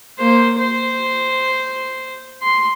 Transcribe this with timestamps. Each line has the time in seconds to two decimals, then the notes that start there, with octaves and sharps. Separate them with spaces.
0.19 A#3 C5
0.58 C5
2.43 C6